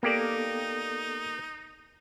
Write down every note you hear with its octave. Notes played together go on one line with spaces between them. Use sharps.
A#3 B3 D#4 G4 A4 D5